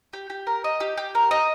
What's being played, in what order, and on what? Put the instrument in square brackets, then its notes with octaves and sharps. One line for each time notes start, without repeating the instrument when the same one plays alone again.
[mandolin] G4
G4
A#4
D#5
G4
G4
A#4
D#5